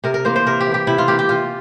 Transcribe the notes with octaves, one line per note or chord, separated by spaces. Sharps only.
C3 A#4
A#4
E3 A#3 C5
C5
C3 A#4
G4
E3
A#3 G4
C3 E4
F4
E3 A#3 G4
G4
C3 F4